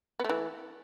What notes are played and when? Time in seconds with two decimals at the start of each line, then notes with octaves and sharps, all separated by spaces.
0.20 B3
0.24 A3
0.29 E3